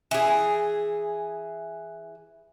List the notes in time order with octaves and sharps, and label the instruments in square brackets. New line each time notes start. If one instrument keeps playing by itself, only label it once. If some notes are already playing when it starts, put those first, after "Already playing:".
[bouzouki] E3 G#4